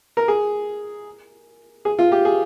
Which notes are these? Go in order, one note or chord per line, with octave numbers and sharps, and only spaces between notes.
A#4
G#4
G#4
F4
G4
G#4